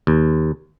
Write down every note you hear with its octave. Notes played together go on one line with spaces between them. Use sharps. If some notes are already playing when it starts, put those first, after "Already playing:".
D#2